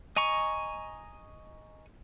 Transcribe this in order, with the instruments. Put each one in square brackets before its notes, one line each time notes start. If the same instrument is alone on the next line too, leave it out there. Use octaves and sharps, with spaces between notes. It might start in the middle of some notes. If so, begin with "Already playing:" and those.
[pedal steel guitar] D#5 G#5 A#5 C#6